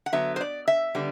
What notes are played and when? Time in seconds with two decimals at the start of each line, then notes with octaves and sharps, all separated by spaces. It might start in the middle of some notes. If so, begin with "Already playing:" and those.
0.06 F#5
0.12 D3 F#3 B3 E5
0.36 C5
0.41 D5
0.68 E5
0.95 D3 G3 B3